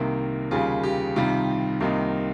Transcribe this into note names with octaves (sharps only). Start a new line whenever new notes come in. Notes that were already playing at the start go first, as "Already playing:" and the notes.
Already playing: C2 C3 D#3 A#3 A#4
D#2 C#3 G3 F4 G#4
G4
C2 C3 D#3 G3 F4
C2 C3 D#3 A#3 D#4